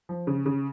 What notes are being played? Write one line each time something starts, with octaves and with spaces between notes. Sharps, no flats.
F3
C#3
C#3